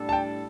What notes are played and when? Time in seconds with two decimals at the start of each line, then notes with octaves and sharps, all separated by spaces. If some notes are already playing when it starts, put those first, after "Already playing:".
Already playing: A2 G3 D4 A4
0.09 A5
0.13 G5